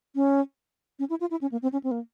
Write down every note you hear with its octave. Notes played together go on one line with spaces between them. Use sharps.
C#4
C#4
E4
F4
E4
C#4
A#3
C4
C#4
C4
A#3